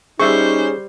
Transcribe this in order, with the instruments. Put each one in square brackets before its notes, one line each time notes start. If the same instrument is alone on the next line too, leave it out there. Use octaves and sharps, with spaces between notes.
[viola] G3 C5 [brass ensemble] C#4 D#4 [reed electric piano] G#4 [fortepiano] E5 C#6